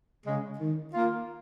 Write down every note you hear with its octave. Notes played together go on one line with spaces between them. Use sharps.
C#3 G#3
D#3
A#3 F4